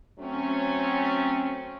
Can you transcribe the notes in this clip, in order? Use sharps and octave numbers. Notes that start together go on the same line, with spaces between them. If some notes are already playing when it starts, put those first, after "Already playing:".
F#3 A3 C4 C#4